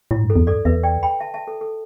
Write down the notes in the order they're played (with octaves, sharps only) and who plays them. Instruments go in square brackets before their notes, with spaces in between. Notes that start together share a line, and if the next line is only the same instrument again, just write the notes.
[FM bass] A2 [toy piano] E4
[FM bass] G2
[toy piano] A4
[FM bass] E2
[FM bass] G2 [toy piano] A4 D5
[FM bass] E2 [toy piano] B4 E5
[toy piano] D5 G5
G5 B5
E5 A5
E5 A5
A4
A4